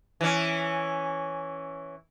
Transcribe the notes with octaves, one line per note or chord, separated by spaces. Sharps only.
E3 C#4